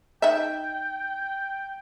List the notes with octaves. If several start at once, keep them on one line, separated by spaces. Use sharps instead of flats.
D#4 E5 G5